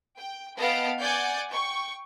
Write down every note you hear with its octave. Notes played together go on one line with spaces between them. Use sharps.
G5
B3 D#5 F5 G5 A5 D7
D5 F#5 G#5 D6 G6 A6
G5 C#6